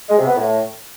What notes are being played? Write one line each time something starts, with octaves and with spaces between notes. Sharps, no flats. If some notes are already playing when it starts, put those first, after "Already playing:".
G#3
C3
B3
A2